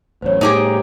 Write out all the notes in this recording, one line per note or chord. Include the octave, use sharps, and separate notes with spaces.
A1 F#2 C5 C#5
A2 G3 D#4 G4 G#4